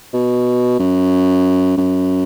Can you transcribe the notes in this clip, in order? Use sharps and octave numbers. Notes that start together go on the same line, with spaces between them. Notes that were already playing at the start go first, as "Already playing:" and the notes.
B2
F#2
F#2